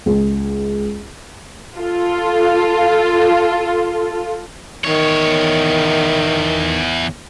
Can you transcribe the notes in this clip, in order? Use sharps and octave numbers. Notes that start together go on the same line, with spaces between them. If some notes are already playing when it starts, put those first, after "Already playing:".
C#2
F4 A4
E2 D#3 C#5